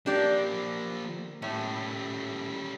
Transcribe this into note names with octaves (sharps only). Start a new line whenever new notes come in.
F3 A#3 D4 G4 D5
A2 G3 C#4